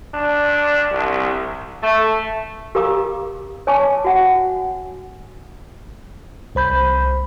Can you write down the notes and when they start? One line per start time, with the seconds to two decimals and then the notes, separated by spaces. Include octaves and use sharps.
0.14 D4
0.91 C2
1.82 A3
2.75 G4 A#4 F5 A#5 D6 D#6
3.67 C#5 G#5 A5 C#6 D6
4.05 F#4 F#5
6.55 C2 C5 B5 G6